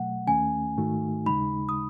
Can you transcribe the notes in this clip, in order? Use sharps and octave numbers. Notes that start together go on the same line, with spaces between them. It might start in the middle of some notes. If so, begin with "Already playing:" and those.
Already playing: B2 F#3 A3 F#5
D#2 D#3 A3 C#4 G#5
G#2 D#3 A3 D#4 F#4
D#2 C#3 G#3 D#4 B5
D#6